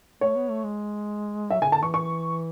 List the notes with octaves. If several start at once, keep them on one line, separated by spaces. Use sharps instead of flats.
A3 C#5
B3
A3
G#3
F#3 E5
C#3 G#5
D3 A5
E3 C#6
C#6